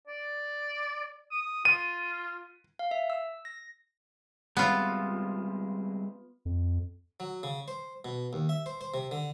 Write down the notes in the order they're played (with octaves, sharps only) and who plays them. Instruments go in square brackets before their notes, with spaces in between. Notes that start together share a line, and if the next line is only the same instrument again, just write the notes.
[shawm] D5
D#6
[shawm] F4 [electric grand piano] D#7
[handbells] F5
E5
E6
A#6
[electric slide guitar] G3 G#3 C4 [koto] B3 F4
[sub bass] F2
[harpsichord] F#3
C#3
C5
B2
D#2
E5
C5
C5
C3
D3